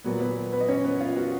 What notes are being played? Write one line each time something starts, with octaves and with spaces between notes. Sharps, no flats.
A#2 F#3 B3
B3 B4
B3 B4
D#5
C#4 C#5
B3 B4
F4 F5
F#4 F#5